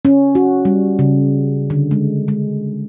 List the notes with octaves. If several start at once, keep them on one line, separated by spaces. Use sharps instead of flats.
C#4
F#4
G3
C#3
D3
G#3
G#3